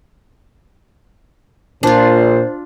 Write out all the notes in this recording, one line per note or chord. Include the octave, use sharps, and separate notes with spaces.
A#2 D4 F4 C5